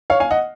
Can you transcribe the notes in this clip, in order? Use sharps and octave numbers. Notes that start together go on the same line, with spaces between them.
C#5 F5
F5 G#5
D#5 F#5